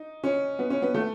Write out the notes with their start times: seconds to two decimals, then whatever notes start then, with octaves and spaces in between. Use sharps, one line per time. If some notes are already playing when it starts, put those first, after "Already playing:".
Already playing: D#4
0.24 C#4
0.59 B3
0.70 C#4
0.82 B3
0.94 A3